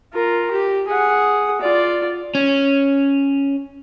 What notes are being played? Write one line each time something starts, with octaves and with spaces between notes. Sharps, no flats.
F4 A#4
G4
G#4 F#5
F4 D5
C#4